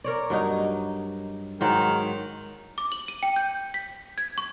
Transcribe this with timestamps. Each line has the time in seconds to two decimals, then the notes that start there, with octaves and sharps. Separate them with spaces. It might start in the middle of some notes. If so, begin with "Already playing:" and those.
0.04 A#4 C#5 D5
0.30 G2 F#3 D#4
1.61 G#2 D#3 F#3
2.78 D6
2.92 F#7
3.08 D#7
3.23 G5
3.36 G6
3.74 B6
4.18 G#6
4.38 C#6